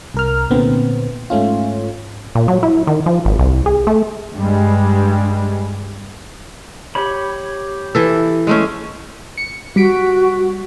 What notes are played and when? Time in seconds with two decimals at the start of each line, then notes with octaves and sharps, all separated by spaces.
0.14 C2 A#4 F6
0.51 A#2 D3 B3 C4
1.30 G#2 A3 C#4 F4
2.35 A#2
2.48 F#3
2.63 E4
2.87 D#3
3.06 F3
3.25 G#1
3.39 C2
3.66 G#4
3.87 A3
4.34 G2 G3 G#3
6.95 G4 C#5 B5
7.95 E3 A4
8.47 G#3 A3 C#4
9.38 C#7
9.76 G3 F#4 B6 D7